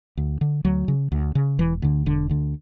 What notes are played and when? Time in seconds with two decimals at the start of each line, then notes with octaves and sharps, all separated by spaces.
0.17 D2
0.41 D3
0.65 D2 F#3
0.88 C#3
1.12 D2
1.35 C#3
1.58 E1 E3
1.82 D2 D3
2.06 E1 D3
2.29 D2 D3